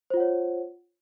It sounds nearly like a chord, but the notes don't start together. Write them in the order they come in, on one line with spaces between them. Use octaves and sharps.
C5 F4 F#5 C#5